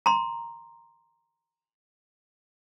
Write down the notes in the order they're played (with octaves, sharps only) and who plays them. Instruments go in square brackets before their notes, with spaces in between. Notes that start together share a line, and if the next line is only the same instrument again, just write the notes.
[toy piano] A#5 C6